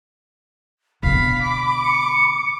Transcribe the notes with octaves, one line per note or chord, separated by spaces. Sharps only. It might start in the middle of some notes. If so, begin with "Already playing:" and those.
B2 D3 F5 B5 B6
D6
C#7